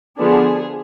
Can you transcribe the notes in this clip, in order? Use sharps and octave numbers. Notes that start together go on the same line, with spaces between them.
D3 F3 B3 D4 G#4